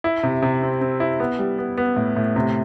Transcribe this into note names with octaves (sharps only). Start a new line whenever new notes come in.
E4
C3
C3
C4
C4
E4
B3
G3
B3
B3
A2
A2
C3